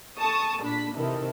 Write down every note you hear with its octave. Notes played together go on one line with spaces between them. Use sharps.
A4 A5 C#6 D#6
A#2 D4 A5 B5 B6
C3 D#3 E3 E4 A4